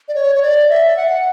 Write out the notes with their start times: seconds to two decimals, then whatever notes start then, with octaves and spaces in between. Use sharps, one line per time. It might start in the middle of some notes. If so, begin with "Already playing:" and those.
0.08 D5
0.15 C#5
0.36 C#5
0.42 D5
0.69 E5
0.97 F#5